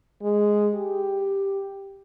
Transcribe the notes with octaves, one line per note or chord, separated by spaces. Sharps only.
G#3
G4